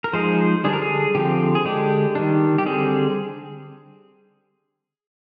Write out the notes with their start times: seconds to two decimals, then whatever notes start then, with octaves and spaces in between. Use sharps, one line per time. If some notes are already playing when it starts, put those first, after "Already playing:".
0.04 A#4
0.13 F3 G#3 D#4 G#4 C5
0.64 D3 G3 D4 G#4
0.73 A#4
0.82 G#4
1.15 D3 F3 C4 G4
1.55 G#4
1.65 D3 G#3 D4 G4
2.15 D#3 G3 D4
2.58 G4
2.66 D3 G3 C4 G#4